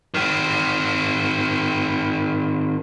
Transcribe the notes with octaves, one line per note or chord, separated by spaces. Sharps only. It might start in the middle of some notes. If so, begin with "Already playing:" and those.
D#3 C4